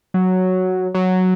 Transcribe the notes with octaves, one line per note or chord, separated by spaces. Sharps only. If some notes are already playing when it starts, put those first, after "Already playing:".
F#3
F#3